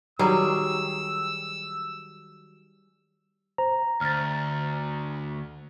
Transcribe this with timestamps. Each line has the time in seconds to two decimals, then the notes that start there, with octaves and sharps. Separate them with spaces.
0.19 D#3 F#3 G3 G#4 E6
3.58 C5 A#5
4.01 D2 F6 A6